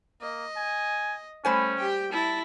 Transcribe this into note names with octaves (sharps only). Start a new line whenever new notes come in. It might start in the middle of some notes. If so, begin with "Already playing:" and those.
A#3 D#5
G#5
G3 A3 C#4 C5 G#5
G4 G5
E4 A5